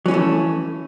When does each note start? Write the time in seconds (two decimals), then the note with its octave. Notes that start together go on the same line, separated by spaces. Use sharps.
0.06 F#3
0.08 C#4
0.11 E3
0.14 A3